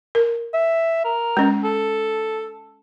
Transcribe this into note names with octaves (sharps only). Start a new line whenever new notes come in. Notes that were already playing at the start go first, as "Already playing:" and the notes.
A#4
E5
A#4
G#3 C#4
A4